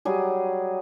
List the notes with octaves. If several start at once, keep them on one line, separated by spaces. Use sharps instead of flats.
F#3 G3 G#4